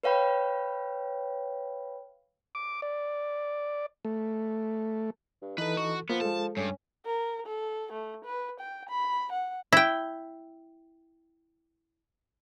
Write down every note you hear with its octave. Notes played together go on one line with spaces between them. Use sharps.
B4 C#5 F5 G5 B5
D6
D5
A3
G2
E3 D#4 A4 B4
F#4
F3 A#3 B3
G#3 A4 A5
G2 C#4
A#4
A4
A3
B4
G5
B5
F#5
E4 G5